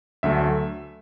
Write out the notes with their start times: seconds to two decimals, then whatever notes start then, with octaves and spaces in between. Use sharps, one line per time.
0.23 D2 D3 F#3 A3 E5